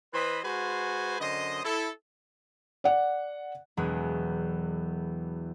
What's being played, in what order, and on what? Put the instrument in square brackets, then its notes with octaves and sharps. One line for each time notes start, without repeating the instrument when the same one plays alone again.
[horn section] E3 B4 C5 D#5 B5
G#3 F#4 B4 C5 G#5
F#2 D3 C5 D#5
E4 A4
[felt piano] D5 F#5
[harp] E1 E2 F#3 G#3 G#5